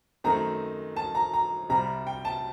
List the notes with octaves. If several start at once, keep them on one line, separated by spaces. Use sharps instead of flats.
F#2 D#3 A3 C4 A#5
A5
A#5
A#5
C2 C3 G3 C4 A#5
G5
A5